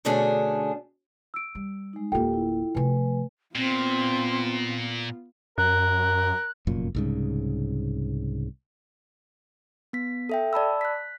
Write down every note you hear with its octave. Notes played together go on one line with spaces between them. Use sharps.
B2 D3 A3 C#4 D4 G#4
E6 D7
G3
G#3 D#4
D1 A#3 F4 G4 A4 G5
E4
C3 F3 A3 B4 G#5
A#2 B3 C4 F4
F#2 A#4 F#6
F1 F#2 A#2
C2 G#2 C#3
B3 B6
A4 E5 G5
D5 A5 B5 E6
F#6 B6